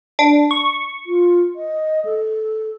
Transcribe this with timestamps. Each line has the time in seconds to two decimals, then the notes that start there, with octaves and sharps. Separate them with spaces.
0.19 D4
0.51 C#6
1.06 F4
1.56 D#5
2.05 A4